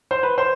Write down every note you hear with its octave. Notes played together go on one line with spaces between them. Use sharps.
C5
B4
C5